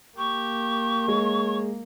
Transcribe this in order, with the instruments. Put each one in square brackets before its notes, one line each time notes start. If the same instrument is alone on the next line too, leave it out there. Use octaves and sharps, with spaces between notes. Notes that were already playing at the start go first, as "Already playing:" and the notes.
[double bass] A#3 [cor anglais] G4 [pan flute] C#6
[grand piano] G#3 [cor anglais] C#5